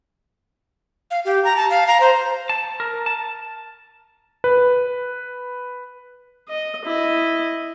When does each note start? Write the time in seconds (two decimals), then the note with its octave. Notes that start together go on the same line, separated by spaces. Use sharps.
1.11 F5
1.25 G4
1.44 A#5
1.56 A5
1.70 F5
1.87 A#5
2.00 C5
2.49 A5
2.80 A#4
3.06 A5
4.44 B4
6.49 D#5
6.85 E4 D#5